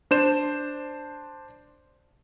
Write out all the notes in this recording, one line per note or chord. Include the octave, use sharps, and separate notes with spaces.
D4 C5 E7